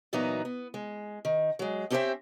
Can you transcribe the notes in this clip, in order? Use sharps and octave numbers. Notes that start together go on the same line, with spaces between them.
A#2 E3 F#3 B3 D#4 F#4
B3
G#3
D#3
F#3 G#3
C4 C#4 G4 A4 C5 E5